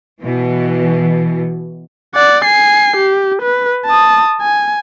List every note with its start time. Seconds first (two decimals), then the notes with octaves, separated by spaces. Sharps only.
0.22 B2 E3
2.14 D5 F#5
2.45 G#5 C7
2.97 G4
3.42 B4
3.86 A5 D#6
4.41 G#5